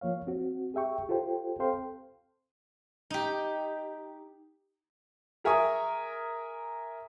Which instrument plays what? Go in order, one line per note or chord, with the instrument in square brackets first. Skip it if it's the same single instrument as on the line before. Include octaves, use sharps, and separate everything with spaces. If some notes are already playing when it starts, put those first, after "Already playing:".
[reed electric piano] F3 A#3 C#5 F5
C4 F#4
G4 G#4 E5 G5 C#6
F4 G4 A4 C5 G5
C4 A4 C5 F5 G5 C6
[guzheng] D#4 G4
[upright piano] G#4 A#4 E5 G#5 C#6 D#6